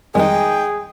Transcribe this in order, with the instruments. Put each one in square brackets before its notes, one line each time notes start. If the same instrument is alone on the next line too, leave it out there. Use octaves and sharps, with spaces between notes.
[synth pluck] F2 D#3 G3 [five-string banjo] G#3 D#4 [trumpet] G#4 [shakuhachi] G5